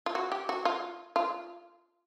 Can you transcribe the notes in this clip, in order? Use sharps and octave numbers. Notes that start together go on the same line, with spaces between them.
F4
F#4
G4
F#4
F4
F4